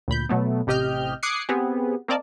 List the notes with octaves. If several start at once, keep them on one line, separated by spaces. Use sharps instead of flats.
D2 A#2 B5 G6
B2 F#3 A3 B3
A1 C3 G4 D#5 F6 G6
D6 D#6 F#6 G#6 C7 C#7
B3 C4 G4 G#4
A#3 C4 A#4 D5 D#5 A5